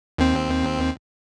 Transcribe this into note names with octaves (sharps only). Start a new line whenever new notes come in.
D#2 C4